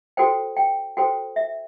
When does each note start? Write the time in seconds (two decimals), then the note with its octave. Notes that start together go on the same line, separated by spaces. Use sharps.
0.17 F#4 A4 C5 G5
0.57 G5
0.97 F#4 A4 C5 G5
1.36 E5